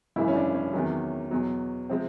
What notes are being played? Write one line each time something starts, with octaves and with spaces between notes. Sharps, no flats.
G#1 F#2 C#3 E3 E4
C#4
D4
C#4
E2 C3 D#3 F#3
E2 B2 F#3
C3 F3 G#3 C4